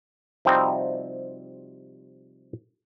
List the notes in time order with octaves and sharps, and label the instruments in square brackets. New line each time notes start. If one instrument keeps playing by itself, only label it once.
[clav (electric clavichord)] C3 F3 G3 C4 D#4 F#4